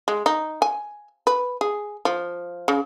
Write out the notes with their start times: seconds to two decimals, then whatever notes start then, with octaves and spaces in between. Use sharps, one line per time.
0.08 G#3
0.26 D#4
0.62 G#5
1.27 B4
1.61 G#4
2.05 F3
2.68 C#3